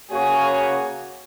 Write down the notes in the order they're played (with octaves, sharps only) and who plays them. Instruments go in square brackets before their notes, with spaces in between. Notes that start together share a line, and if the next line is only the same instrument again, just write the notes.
[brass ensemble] C#3 A#3 F#4 C#5 [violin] G#4